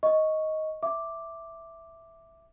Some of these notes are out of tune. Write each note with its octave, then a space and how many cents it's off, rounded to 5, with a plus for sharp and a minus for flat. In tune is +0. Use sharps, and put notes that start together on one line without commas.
D#5 +10 C#6 +0
E5 +0 D6 +0